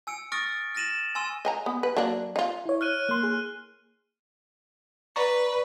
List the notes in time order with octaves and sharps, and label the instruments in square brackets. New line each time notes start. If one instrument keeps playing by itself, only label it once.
[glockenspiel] G#5 E6 C#7 D7
C#6 D#6 F6 A6 A#6 D7
F6 A6 A#6 D#7 E7 F#7
G#5 C6 E6
[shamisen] D#5 G#5 A#5
B3
B4
F#3 A#3 D4
D#4 F4
[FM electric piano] E4 C#5
[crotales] F6 F#6 D#7
[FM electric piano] A#3 C6
G#4
[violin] B4 [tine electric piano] D5 A#5 C#6